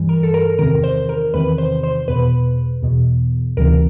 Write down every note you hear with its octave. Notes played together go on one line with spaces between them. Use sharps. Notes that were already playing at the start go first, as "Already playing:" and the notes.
Already playing: G2 E3
A#4
A4
A#4
E2 C3 D#3 A#4
C5
A#4
E2 C3 D#3 B4
C5
C5
E2 B2 B4
E2 B2
D2 C3 E3 A#4